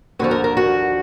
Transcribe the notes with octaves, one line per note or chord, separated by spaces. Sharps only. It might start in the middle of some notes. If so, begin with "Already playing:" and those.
D#2 D3 F3 F#4
A#4
A#4
F#4